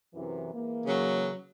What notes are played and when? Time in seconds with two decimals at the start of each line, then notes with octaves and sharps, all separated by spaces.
0.14 F#2 C3 E3
0.53 E3 G#3 A#3
0.86 C#3 F#3